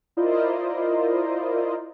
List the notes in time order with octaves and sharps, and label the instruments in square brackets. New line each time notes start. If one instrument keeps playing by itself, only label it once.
[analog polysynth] E4 F4 A#4 C5 D5 D#5